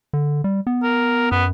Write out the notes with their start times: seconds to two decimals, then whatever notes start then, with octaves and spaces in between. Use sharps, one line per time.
0.13 D3
0.44 G3
0.67 B3
0.83 A#4
1.32 F#2 B3